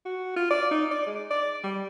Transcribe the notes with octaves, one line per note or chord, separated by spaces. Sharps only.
F#4
F4
D5
D#4
D5
G#3
D5
G3